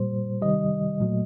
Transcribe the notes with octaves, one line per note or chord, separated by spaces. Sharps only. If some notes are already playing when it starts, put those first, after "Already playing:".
Already playing: A#2 G3 C5
C3 D#3 G3 D#5
A#2 F#3 A3